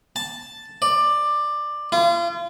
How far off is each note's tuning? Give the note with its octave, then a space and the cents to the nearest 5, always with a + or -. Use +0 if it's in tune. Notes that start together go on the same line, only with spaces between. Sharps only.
A5 +0
D5 +15
F4 -35